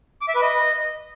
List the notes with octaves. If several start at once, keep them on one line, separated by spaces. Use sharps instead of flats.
D6
E5
B4
D#5